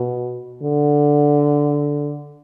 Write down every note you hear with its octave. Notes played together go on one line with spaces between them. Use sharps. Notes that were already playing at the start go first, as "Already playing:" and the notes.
Already playing: B2
D3